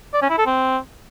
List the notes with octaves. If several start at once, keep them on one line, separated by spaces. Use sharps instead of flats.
D5
C#4
E4
A4
C4